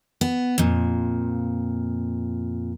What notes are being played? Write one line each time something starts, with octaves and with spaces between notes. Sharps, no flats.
B3
F2 A#2